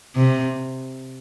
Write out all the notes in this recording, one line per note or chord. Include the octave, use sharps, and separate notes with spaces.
C3